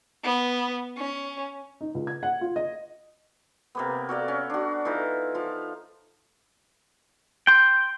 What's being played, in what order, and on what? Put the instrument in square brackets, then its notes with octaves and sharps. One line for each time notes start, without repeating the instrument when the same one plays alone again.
[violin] B3
C#4
[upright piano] D#4
C#2
G#6
F#5
F4
D#5
[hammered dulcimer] C3 A#3 B3
F#4 A4 D5 F5
C#4
D4 F#4
E3 D#4 F4 A4
F3 F4
[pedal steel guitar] G5 C6 [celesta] G6